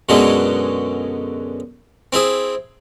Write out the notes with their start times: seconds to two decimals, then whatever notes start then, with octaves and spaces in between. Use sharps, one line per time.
0.09 F#2 B2 D3 F#3 G#3
2.13 C4 E4 G#4